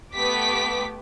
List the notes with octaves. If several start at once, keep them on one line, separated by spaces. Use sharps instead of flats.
A3 B3 G4 D6 B6